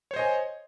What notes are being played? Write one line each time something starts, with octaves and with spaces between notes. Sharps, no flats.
C5 C#5 D#5 G#5